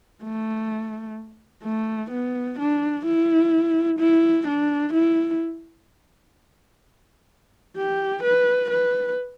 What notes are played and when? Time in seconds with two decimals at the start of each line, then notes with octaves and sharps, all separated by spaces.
0.23 A3
1.64 A3
2.11 B3
2.59 D4
3.05 E4
3.99 E4
4.47 D4
4.94 E4
7.77 G4
8.23 B4
8.70 B4